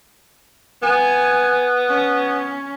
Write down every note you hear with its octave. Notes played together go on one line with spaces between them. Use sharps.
B3 G#5
C#4